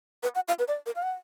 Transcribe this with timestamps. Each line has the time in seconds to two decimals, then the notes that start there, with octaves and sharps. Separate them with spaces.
0.23 B4
0.35 F#5
0.48 F5
0.59 B4
0.68 D5
0.86 A#4
0.96 F5
1.03 F#5